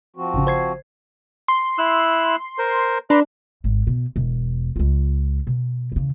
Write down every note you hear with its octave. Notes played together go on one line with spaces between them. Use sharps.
F3 C4 F#4
G#1 C#3
C5 G#6 C7
C6
E4 E6 F#6
A#4 C5
D4 B4 A#5 C6
G#1
B2
E1
C#2 F4
B2
E2 C#3